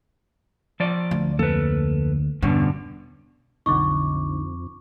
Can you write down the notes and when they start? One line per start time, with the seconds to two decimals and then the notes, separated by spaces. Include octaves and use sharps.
0.80 F3 D5
1.11 D2
1.39 F2 F3 A#3 A4 B4
2.42 E2 G2 B2 D3 C#4
3.66 B1 F2 D3 D#4 C#6 D6